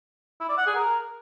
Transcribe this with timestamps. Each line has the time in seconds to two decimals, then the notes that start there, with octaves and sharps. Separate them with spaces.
0.40 E4
0.49 D5
0.58 F#5
0.67 G#4
0.76 A#4